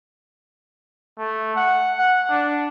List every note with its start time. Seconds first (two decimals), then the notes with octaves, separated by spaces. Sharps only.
1.18 A3
1.56 F#5
1.98 F#5
2.29 D4